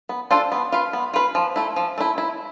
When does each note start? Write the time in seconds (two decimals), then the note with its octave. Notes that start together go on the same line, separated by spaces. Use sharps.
0.09 B3
0.31 D4 F4 A4 C5
0.52 B3
0.72 F4 B4 F5
0.93 B3
1.14 F4 B4 F5
1.35 F3
1.56 A3 E4
1.76 F3
1.98 A3 E4
2.18 E4